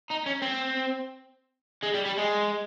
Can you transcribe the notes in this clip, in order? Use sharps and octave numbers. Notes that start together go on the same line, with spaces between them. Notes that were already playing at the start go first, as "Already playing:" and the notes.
D#4
C#4
C4
G#3
G3
G3
G#3